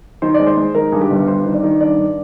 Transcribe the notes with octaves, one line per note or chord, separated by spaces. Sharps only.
D#3 C5
D5
G#3
C5
G#3
D#3 A#4
G2 G#4
G4
G1
G2 C5
D#3
D5
D#3
G2 D5
G2